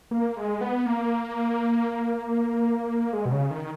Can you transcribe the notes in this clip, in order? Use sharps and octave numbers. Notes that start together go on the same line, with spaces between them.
A#3
G#3
B3
A#3
G#3
B2
C#3
D#3